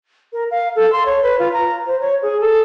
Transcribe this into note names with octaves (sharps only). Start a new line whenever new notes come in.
A#4
F5
A4
C6
C#5
B4
F4
A#5
C5
C#5
G#4
A4